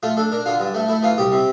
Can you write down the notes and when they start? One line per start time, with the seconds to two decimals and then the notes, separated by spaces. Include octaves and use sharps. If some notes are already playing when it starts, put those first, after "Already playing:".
0.03 A3 F4
0.17 D4 A4
0.32 D4 A#4
0.46 D3 F4
0.60 G2
0.74 A3
0.88 A3 E4
1.03 E3 F4
1.18 C2 G4
1.32 C3